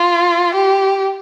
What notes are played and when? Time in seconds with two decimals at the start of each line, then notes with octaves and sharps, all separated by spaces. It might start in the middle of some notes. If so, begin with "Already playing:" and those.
Already playing: F4
0.55 G4